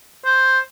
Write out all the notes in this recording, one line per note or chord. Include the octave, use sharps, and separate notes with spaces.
C5